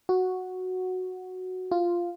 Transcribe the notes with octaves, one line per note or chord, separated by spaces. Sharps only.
F#4
F4